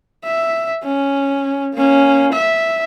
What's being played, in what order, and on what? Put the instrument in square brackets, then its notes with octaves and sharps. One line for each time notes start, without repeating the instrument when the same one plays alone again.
[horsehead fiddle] E5
C#4
A#3 C#4
E5